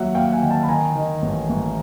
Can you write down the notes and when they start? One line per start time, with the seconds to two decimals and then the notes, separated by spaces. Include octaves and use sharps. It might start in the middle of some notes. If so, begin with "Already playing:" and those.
Already playing: D#2 F#3 E5 F#5
0.15 D#2 F5 G5
0.32 F#5 G#5
0.42 D#3
0.50 G5 A5
0.63 B5
0.68 D#3 G#5 A#5
0.95 D#3
1.22 A1
1.49 A1